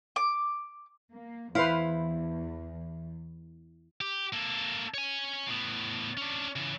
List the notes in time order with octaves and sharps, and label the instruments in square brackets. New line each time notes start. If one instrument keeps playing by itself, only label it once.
[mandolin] D6
[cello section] A#3
[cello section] E2 [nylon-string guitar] E4 [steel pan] B4 C5 F5
[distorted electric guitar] G4
A#3 A4
C#5 G#5
A2 B3
C#4 D4
C#3 E3